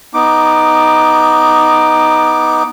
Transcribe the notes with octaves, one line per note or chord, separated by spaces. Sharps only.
B3 D#4 D6